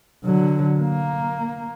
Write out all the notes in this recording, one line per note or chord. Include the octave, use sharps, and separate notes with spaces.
D3 F#3
A#3